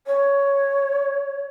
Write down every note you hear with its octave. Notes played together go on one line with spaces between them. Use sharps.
C#5